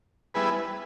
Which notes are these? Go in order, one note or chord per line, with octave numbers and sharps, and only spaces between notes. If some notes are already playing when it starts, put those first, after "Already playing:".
G3 B3 E4 G#4 B4